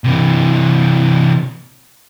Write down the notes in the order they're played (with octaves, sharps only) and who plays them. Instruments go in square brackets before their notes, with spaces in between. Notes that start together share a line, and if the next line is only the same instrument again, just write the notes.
[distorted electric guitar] C3 E3